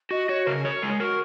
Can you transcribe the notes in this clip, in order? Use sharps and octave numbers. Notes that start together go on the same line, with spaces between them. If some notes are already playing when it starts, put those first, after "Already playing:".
F#4 D#5
F#4 C#5
C#3 A#4
G#4 C#5
A#4
G#3 G#4
F#4 A#4